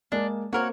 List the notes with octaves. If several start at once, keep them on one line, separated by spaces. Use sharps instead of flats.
G#3 A#3 D4
A#3 C4 F#4 A#4 C#5